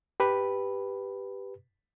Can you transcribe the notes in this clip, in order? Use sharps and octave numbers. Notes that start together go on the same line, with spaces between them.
G4 B4